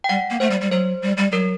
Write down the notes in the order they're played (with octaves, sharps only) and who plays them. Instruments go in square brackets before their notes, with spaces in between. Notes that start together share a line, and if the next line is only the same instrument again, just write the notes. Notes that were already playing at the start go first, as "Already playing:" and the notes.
[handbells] G5
[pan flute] G3 [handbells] F#5
[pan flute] A#3
[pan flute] A3 [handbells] C5
[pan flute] G3
G3
[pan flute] F#3 [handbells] C5
[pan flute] G3
G3
[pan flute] F#3 [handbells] A#4